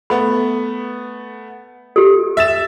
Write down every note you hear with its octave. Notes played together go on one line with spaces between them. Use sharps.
A3 B3 B5
G4 A4
E5 A6 E7